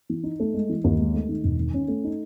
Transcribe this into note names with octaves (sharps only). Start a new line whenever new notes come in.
E3
D#4
A3
G#3
E3
D#2
G#3
A3
D#3
E1
D#3
C#4
A3
D#4